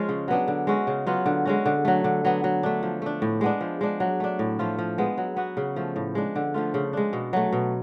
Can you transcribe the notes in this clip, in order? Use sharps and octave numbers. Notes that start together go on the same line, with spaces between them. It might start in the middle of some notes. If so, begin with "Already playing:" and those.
Already playing: F3 G#3 C#4 F4
C#3
F#3 B3 D4
D3
G#3 C#4 F#4
C#3
F#3 B3 F4
D3
G#3 C#4 F#4
D3
F#3 A3
D3
F#3 B3
F#3
A3 D4
F3
A3 D4
A2
G#3 B3 D4
F3
G#3 D4
F#3
A3 D4
A2
F3 A3 F4
F3
G#3 B3
F#3
B3 F#4
C#3
F3 A3
A2
G#3 D4
D3
F3 A3 F4
C#3
G#3 D4
B2
F#3 A3
B2